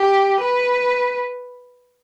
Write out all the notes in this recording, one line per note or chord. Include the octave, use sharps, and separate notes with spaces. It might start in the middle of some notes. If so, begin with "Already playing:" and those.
Already playing: G4
B4